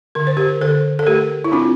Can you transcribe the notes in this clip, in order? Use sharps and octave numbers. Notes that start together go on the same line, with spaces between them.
D3 A#4
C5
G4 A#4
D3 A4 C5
A4
A3 G4 A#4
E4
C4 D4 F4